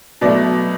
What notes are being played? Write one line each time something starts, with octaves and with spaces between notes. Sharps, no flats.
B2 F#3 A3 D5